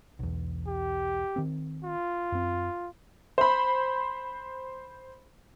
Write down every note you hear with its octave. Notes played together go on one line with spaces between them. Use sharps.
B1 E2
G4
D#3 C4
F4
F#2 C4
C5 B5